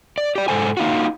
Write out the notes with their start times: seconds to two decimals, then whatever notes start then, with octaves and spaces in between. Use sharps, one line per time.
0.18 D5
0.35 G4 D5
0.48 G#2 G#3 A4 C5 G#5
0.77 A#3 D#4 F4 F#4